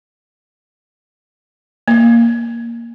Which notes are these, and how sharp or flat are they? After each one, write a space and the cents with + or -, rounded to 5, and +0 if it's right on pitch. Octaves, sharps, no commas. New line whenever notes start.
A#3 +0